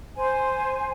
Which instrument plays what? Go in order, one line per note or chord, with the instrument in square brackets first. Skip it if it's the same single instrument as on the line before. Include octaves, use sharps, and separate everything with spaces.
[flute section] C5 G#5